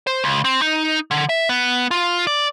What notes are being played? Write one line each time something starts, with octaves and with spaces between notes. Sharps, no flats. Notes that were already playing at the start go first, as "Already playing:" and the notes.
C5
C#2
C4
D#4
D3
E5
B3
F4
D5